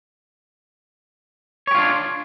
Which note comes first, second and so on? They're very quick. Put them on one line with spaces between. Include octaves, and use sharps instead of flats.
C#5 G4 F4 D4